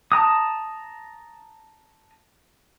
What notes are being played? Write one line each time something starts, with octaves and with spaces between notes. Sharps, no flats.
A5 A#5 D#6